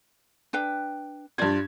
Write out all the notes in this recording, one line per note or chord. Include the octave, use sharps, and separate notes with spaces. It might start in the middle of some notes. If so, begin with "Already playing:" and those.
D4 B4 G5
G2 F4 C5 D5 G#6